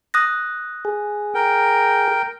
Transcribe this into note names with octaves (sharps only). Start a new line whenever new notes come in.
D#6 F#6 A#6
G#4
A#4 G5